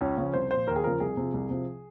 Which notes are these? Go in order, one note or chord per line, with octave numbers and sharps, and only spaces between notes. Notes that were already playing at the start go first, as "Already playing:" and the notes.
C#2 C#4
C#3 F3
C2 C5
A#2 F3 C5
D#2 A#4
G#4
C#3 F3 A#4
C2 G#4
C3 F3
C2
C3 F3